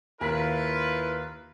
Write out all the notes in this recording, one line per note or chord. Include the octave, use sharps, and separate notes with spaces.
D#2 E4 F4 A#4 B4 B6